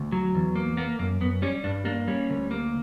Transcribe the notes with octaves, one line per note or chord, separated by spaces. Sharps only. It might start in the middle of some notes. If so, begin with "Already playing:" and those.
Already playing: D2
F#3
E2
A#3
A#3 B3
F#2 A#3
F#2 B3
G3 C#4
G2 D4
A#3 D4
G3 C#4
D2
A#3